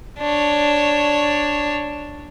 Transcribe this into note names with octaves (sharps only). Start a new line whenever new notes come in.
D4 C#5